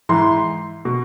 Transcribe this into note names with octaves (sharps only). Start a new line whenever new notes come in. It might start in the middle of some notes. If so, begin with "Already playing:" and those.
G#2 E3 C6
B2